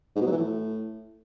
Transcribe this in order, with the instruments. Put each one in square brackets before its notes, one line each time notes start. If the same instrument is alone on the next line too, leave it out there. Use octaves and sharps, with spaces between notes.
[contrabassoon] G#2
B2
F#3
E3
A2